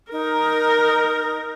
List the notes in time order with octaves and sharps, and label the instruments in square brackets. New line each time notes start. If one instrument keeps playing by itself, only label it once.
[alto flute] D#4 [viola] A#4